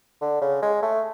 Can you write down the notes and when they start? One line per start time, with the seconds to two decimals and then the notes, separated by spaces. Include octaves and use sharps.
0.21 D3
0.41 C#3
0.62 G#3
0.82 A3